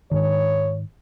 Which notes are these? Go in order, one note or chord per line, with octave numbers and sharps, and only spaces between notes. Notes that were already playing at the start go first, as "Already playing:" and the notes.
G#2 D#3 C#5